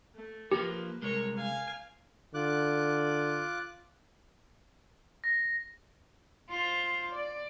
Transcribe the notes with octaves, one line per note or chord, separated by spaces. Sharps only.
A3
F3 A#3 G4 B4
C2 G#3 A#4 C#5
F5 G#5
D3 F4 D6 F#6
A#6
F4 C5
D5